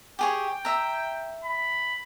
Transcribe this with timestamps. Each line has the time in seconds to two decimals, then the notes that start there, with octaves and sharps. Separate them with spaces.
0.19 G4 G#4 C#5 G5
0.65 E5 A#5
1.44 B5